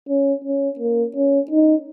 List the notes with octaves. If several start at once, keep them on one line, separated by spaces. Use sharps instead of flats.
C#4
C#4
A#3
C#4
D#4